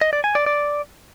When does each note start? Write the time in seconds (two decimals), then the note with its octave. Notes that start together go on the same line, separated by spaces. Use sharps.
0.01 D#5
0.13 D5
0.24 G#5
0.35 D5
0.46 D5